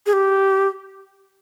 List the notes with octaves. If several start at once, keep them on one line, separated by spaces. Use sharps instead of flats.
G#4
G4